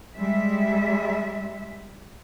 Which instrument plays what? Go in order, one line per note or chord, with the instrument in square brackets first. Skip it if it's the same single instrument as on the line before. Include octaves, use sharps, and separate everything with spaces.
[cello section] G3 G#3 E5